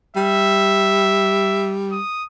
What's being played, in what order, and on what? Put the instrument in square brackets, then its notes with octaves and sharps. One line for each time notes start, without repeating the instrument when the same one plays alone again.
[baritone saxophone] G3 [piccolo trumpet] E5
[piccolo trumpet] D#6